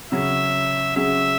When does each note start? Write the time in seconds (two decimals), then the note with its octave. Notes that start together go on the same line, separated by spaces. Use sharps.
0.11 C#3 F#3 C#4 G#4 E5
0.96 C#3 F#3 C#4 G#4 E5